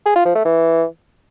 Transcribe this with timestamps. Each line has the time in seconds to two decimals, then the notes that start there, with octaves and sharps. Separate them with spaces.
0.06 G#4
0.15 F4
0.25 F3
0.35 A3
0.45 E3